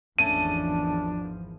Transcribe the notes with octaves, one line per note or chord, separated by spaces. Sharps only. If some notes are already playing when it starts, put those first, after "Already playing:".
G#1 E2 F3 A3 C#4 D4 D#7